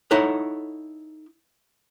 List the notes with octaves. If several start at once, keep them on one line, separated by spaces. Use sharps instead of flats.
D#4 E4 A4 C#5 F#5